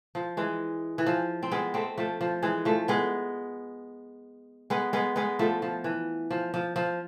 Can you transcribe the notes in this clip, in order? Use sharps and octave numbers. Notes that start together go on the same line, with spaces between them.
F3
E3 G#3
E3
F3
C4
G#3 B3
A3 C4
F3 A3
F3
E3 G#3
F3 A3
G#3 B3
G#3 B3
G#3 B3
G#3 B3
F3 A3
F3
E3
F3
F3
F3